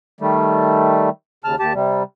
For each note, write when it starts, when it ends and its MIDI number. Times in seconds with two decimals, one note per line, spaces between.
0.21 1.09 51
0.21 1.09 55
0.21 1.09 57
1.44 1.55 39
1.44 1.55 49
1.44 1.55 81
1.44 1.55 89
1.60 1.73 39
1.60 1.73 67
1.60 1.73 81
1.74 2.03 48
1.74 2.03 55